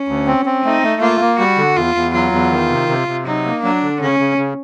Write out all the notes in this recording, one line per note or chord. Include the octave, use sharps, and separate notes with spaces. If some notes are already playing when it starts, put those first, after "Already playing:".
Already playing: C#4
D2
C4
C4
A3 D#4
A3
A#3 F4
A#3
G3 F#4
D3
E2 F4
E2
F#3 F4
E2
D#3
C3
C3
C3
F#3 D#4
A#3
F#3 D4
D3
C#3 C#4
C#3
C#3